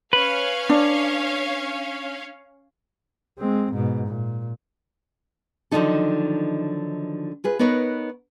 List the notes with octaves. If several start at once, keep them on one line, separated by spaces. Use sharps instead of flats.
C#4 B4 C#5 F5
D4
G#3 C4
G#2 B2
A#2
D3 D#3 F3 F#3 D#4 A4
F4 G#4 B4
B3 D#4 A#4 B4 C#5